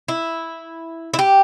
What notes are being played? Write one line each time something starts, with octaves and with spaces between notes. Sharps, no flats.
E4
E4
G4